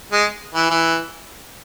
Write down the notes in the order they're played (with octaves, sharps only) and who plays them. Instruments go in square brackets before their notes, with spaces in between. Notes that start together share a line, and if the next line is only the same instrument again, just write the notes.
[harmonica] G#3
E3
E3